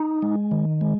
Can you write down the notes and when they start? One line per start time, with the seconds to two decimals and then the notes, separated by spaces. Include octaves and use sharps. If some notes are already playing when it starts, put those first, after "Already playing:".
Already playing: D#4
0.22 G#3
0.51 D#3
0.81 G#3